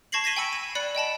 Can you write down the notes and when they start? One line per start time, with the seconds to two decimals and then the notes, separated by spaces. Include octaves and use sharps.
0.12 A5 C#6 G#6 A#6 C7 F#7
0.24 G#6 A#6 B6 D#7 G7
0.36 G5 G#5 B5 E6 G#6 C#7
0.53 D#7
0.75 D5 B5 F#6 C#7
0.95 D#5 G5 A5 B5